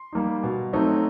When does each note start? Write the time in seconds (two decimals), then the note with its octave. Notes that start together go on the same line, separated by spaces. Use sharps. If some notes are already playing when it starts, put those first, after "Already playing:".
Already playing: C6
0.13 G3 A#3 D#4
0.44 B2
0.73 F#3 A3 C4 D#4